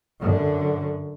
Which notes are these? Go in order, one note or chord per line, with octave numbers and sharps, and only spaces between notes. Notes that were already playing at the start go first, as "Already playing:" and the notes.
F#2 D3